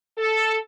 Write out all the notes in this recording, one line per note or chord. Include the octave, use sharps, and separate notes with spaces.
A4